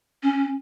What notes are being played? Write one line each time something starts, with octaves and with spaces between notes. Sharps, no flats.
C#4